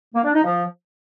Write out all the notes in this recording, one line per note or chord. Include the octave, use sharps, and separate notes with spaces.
A#3
D4
D#4
F3